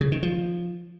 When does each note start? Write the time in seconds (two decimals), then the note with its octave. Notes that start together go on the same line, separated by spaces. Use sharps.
0.01 C#3
0.12 D#3
0.23 F3